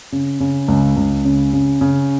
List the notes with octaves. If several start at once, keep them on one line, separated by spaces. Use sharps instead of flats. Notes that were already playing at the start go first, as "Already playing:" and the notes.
C#3
C#3
C#2
C#2
C#3
C#3
C#3